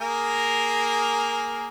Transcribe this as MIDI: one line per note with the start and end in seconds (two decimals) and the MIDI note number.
0.01 1.68 58
0.01 1.68 68
0.01 1.68 70